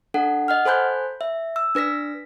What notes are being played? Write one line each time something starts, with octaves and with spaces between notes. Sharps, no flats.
D4 A4 F#5
D#5 F#5 F6
A4 C5 G#5 B5 F#6 G6
E5
E6
D4 B4 A#6 B6